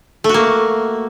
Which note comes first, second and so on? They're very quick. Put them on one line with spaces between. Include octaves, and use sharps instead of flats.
A3 F#4 A#3